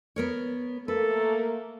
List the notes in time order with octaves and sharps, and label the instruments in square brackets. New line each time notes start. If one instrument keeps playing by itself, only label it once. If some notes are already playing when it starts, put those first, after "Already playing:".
[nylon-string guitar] B3 A#4 C#5
[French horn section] A3 A#3 [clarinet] A4 [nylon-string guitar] B4